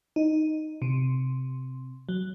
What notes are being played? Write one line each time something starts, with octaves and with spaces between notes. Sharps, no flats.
D#4
C3
F#3